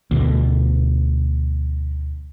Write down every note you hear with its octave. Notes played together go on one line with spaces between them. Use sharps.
D2 B2